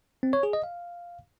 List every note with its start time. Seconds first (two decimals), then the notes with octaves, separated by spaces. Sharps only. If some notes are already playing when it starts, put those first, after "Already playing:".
0.23 C4
0.33 C#5
0.43 G#4
0.53 D#5
0.63 F5